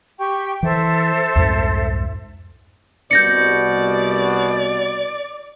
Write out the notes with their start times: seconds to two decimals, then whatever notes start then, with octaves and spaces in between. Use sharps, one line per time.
0.19 G4 G5 C#6
0.63 E3 A4 C5 E5
1.35 C2 F2 G#2
3.11 C2 B2 D5 G6 A#6 C#7